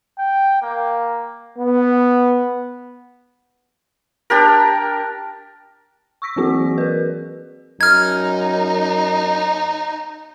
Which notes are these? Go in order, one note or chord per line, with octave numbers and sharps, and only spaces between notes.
G5
A#3
B3
D4 G4 A#4
C#6 E6 A#6 B6
E3 F#3 A#3 C4 F#4 G#4
A#4 B4
F#2 D#4 F6 G#6